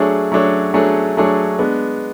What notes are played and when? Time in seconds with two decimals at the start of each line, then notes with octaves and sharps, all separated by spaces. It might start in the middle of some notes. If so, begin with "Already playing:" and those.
Already playing: F#3 A3 D4 G#4 C#5
0.32 F#3 A3 D4 G#4 C#5
0.74 F#3 A3 D4 G#4 C#5
1.17 F#3 A3 D4 G#4 C#5
1.59 G#3 B3 D4